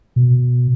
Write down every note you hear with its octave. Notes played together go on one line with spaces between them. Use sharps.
B2